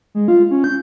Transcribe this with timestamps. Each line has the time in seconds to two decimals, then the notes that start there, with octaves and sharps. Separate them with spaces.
0.15 G#3
0.28 F4
0.51 C#4
0.64 G6